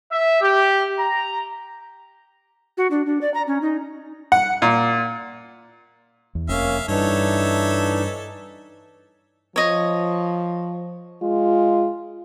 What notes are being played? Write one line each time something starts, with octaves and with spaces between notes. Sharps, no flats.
E5
G4
A#5
F#4
D4
D4
D5
A#5
C#4
D#4
F#5
A#2
E2
F1 A#3 C#4 E5 F5
G2 E3 D4 D#4 A4 C#5 E5
F3 C#5 D#5
G#3 F4